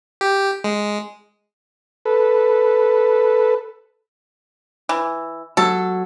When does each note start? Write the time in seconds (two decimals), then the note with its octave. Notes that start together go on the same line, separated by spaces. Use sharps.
0.21 G4
0.64 G#3
2.05 A4 B4
4.89 E3
5.57 F#3 A4